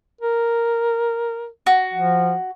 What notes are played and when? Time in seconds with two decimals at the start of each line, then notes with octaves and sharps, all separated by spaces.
0.21 A#4
1.66 F#4
1.93 F3